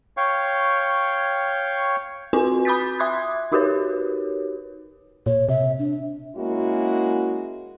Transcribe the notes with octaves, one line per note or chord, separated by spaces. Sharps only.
C#5 F5 G5 C#6
C4 F4 F#4 B4 G#5 C6
B5 D6 D#6 G6 A6 B6
E5 C6 D6 D#6 F#6 G#6
D#4 F#4 G4 A#4 B4 C#5
A#2 C#5
C3 E5
D4
G#3 A#3 C#4 E4 F#4